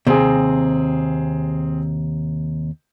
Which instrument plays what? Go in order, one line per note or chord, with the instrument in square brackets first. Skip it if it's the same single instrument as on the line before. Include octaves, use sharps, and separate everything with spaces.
[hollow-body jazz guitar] D#2 C3 [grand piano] C4 G#4